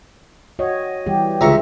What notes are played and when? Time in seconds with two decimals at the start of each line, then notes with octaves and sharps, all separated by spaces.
0.59 F#4 C#5 D#5
1.06 E3 G3 G4
1.41 C#2 D3 E5 A#5 C#6